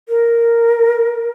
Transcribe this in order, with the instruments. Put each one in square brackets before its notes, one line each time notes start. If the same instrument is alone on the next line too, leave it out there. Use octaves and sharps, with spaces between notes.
[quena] A#4